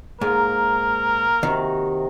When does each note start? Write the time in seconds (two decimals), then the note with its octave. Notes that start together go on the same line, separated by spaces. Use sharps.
0.21 G#2 A#3 A#4
1.43 C3 D#3 F#4